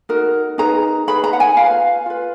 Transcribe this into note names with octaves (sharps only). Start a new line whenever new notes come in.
D#4 F#4 A#4
D#4 G#4 B4 A#5
D#4 G#4 B4 B5
A#5
F#5
G#5
F4 B4 F5
F4 B4